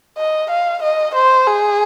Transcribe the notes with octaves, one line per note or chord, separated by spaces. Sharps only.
D#5
F5
D#5
C5
G#4